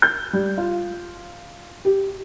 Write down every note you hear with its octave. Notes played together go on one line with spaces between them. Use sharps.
G6
G3
F4
G4